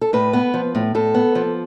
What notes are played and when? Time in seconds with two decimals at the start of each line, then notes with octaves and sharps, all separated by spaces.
0.01 A4
0.13 A2 B4
0.33 B3
0.54 F3
0.75 A2
0.95 A2 A4
1.14 B3
1.35 F3